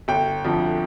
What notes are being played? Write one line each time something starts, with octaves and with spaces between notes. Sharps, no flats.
G1 G5
F2 D3 F3